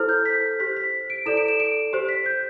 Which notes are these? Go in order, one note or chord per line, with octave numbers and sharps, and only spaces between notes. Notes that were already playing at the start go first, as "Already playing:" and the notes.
Already playing: E4 A4 C5 F6
G6
B6
G4 C5 B6
B6
D7
E4 A4 D5 E7
D7
E7
D7
G4 C5
B6
G6